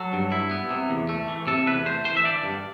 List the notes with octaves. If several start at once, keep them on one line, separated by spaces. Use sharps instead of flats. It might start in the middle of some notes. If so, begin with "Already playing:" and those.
Already playing: F#3 A4
G2
E4
B3
C3
E2
A3
E3
C3 A4
E2 B4
A3 C5
E3 C5
E5
D3 D5
G2